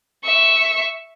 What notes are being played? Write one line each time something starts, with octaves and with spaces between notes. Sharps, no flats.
E5 C#6